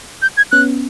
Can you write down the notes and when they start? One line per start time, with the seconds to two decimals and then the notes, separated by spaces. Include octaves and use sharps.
0.22 G6
0.37 G#6
0.52 B3 C#4 F#6